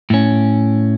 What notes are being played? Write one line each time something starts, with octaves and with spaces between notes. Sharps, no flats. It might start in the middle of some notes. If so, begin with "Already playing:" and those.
A2 C#4